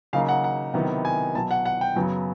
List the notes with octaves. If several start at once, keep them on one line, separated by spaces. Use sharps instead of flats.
C#3 F#3 A#3 D#4 F5
F#5
F#5
C3 D#3 F#3 B3 E4
G#5
B2 F#3 B3 A5
F#5
F#5
G5
F#2 C#3 F#3 B3